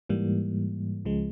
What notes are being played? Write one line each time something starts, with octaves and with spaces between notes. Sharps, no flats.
G#2 E3 G3 A#3
C#2 C#3 F3 G#3